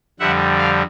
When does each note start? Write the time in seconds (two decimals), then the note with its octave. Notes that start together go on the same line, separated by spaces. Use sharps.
0.20 F2 D3 G3 E5 F#5
0.59 F5